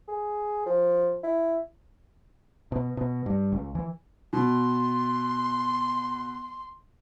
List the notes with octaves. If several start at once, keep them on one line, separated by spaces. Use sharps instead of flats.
G#4
F3
E4
B2
B2
G2
C#2
E3
B2 C6